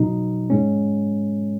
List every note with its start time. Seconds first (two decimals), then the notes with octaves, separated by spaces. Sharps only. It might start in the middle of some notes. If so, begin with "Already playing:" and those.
Already playing: B2 F#3 D#4
0.50 G#2 G#3 C#4